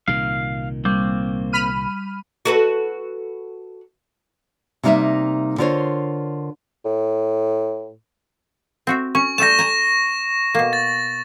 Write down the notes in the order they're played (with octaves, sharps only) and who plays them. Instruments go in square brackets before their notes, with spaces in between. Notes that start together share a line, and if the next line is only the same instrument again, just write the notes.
[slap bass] C2 A#2 D#3 [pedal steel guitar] F5
[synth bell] G3 [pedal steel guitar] A#3 C4
[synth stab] B5 F6 D#7
[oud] F#4 A4 B4
[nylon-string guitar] C3 G3 A#3 D#4 A#4 E5
D3 F4 A#4 C5 C#5
[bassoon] A2
[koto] C4 F#4 E5
[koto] C#4 [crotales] C#6
[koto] G3 A3 A5 [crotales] A#6 E7
[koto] G#5 A#5
B2 A#3
[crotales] A6